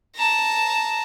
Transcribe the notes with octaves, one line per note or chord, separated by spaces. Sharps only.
A5 A#5